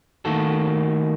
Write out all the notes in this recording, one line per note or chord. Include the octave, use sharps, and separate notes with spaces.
D#3 A3 A#3 F#4 A4